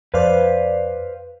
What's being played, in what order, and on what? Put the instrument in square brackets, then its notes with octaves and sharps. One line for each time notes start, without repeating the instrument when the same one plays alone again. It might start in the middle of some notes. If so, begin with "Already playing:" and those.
[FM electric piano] F2 D5 [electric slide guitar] B4 C5 F5